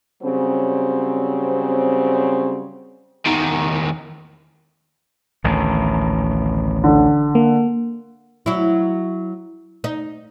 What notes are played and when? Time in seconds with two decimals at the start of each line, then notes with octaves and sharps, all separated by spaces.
0.23 C#3 F#3 G3 C4
3.26 E2 D#3
5.44 A1 D2 D#3
6.84 D3
7.35 A#3
8.46 F#3 E4
9.84 D#4